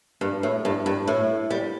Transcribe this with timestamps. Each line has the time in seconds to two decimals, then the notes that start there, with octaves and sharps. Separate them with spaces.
0.21 G2
0.43 A2
0.65 G2
0.86 G2
1.07 A2
1.50 G3